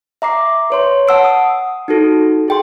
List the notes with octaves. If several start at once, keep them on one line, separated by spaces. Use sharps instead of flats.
E5 A#5 D6 C7
B4 C#5 C6
F#5 A5 E6 C7 D7
D#6
D#4 F#4 A4
G#4 G5 C6